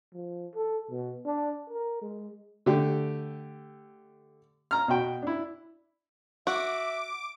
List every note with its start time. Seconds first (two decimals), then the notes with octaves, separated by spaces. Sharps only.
0.14 F3
0.55 A4
0.90 B2
1.25 D4
1.70 A#4
2.01 G#3
2.66 D3 A3 G4
4.71 A#5 F6
4.88 B2 F#4 G5
5.22 D4 E4
6.47 F#4 E5 D6